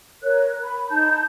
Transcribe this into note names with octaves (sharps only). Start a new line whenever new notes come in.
A#4 C#5 F#6
B5
D#4 A5 G6